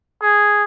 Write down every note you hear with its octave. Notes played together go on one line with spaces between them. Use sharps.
G#4